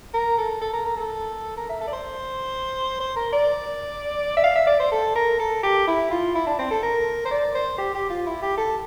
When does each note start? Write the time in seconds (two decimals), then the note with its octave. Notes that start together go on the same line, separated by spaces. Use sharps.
0.14 A#4
0.38 A4
0.61 A4
0.73 A#4
0.86 A#4
0.97 A4
1.57 A#4
1.69 E5
1.81 A4
1.87 D5
1.93 C5
3.00 C5
3.16 A#4
3.33 D5
4.37 E5
4.44 F5
4.55 E5
4.67 D5
4.80 C5
4.92 A4
5.15 A#4
5.39 A4
5.63 G4
5.87 E4
6.11 F4
6.35 E4
6.47 D4
6.59 C4
6.71 A4
6.83 A#4
7.25 C5
7.31 D5
7.55 C5
7.78 G4
7.94 G4
8.10 F4
8.26 E4
8.42 G4
8.58 A4